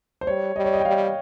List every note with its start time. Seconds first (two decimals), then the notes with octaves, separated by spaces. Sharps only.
0.21 C5
0.27 G3 C#5
0.56 G3 D#5
0.65 C#5
0.74 D#5
0.80 G5
0.85 G3 F5